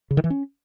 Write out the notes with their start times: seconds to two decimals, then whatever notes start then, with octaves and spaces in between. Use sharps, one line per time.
0.11 C#3
0.17 D#3
0.24 E3
0.30 C#4